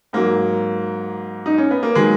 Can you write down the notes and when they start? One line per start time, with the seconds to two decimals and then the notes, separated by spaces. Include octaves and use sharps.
0.13 G#2 F#3 A#3
1.46 D#4
1.58 C#4
1.71 B3
1.83 A#3
1.95 D#3 F#3 G#3